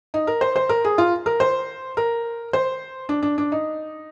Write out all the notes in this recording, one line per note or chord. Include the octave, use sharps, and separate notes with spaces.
D#4
A#4
C5
C5
A#4
G#4
F4
A#4
C5
A#4
C5
D4
D4
D4
D#4